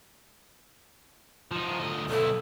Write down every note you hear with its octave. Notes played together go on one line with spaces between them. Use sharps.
F3 D#4
D2 D#5
B1 E4 A4